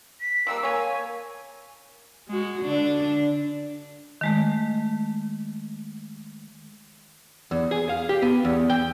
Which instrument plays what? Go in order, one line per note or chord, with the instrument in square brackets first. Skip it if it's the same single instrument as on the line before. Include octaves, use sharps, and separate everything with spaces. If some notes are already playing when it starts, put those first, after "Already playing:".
[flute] B6
[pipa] F3 G3 A#3 [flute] E6
[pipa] A#3 C#5 [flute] G#5
[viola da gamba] G#3 F#4
D3 D4
[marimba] D#3 G#3 A3
[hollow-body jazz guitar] E2
G#4
F5
G4
B3
E2
G5